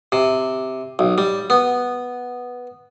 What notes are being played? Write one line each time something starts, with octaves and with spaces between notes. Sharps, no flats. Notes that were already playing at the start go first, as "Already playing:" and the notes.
C3
B1
G3
B3